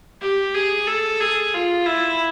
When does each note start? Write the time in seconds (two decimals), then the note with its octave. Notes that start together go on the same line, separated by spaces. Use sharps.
0.21 G4
0.54 G#4
0.87 A4
1.20 G#4
1.53 F4
1.86 E4